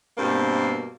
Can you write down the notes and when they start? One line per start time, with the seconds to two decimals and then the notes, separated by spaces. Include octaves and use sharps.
0.18 G2 B2 A#3 C4